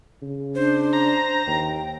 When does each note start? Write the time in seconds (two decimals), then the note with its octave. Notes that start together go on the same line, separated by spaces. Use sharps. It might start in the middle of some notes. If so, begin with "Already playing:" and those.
0.22 C#3
0.55 D4 C5
0.93 A#5
1.47 D#2 G5